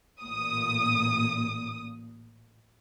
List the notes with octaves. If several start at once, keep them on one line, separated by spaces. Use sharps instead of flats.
A1 A#2 D#6